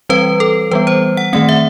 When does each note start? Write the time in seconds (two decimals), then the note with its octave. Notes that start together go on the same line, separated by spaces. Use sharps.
0.09 E3 G3 C4 B4
0.40 A4
0.71 E3 G3 B3 B4
0.87 C5
1.17 F#5
1.33 D#3 A3 C4 F#5
1.49 E5